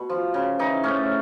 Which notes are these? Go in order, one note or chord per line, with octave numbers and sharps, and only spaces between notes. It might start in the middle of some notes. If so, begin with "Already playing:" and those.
Already playing: B2
F3
C#3
E3 D#4
A2 C#4